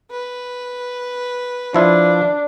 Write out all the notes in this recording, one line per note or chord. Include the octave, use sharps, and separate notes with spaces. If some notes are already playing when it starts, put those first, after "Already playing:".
B4
F3 D4 E4 F4